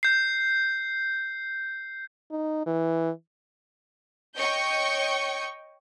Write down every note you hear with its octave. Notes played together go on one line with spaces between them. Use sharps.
G6 C7
D#4
E3
C#5 D#5 G5 C#6 G6